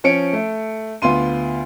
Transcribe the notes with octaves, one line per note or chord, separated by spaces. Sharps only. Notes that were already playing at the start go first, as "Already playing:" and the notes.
F3 C#4 C#7 D7
A3
D2 B3 F4 C6 D#7